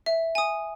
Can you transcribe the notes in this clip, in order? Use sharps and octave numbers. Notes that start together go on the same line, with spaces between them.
E5
G#5 D#6